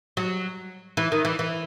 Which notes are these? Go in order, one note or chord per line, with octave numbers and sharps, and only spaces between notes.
F#3
E3
D#3
E3
E3